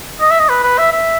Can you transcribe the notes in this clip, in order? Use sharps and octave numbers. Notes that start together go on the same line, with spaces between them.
D#5
E5
D#5
B4
B4
E5
E5